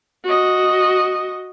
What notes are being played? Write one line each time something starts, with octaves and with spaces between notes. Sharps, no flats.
F#4 D#5